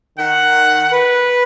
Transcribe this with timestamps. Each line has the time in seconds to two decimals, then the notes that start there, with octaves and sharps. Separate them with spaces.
0.18 D#3 F#5
0.92 B4